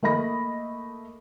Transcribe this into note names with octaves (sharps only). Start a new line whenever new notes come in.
A3 A#3 D#5 B5 A#6